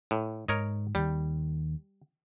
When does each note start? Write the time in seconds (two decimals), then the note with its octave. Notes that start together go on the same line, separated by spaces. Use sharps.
0.11 A2
0.48 G#2 A#4 C#5 D#5
0.95 D#2 D#3 G3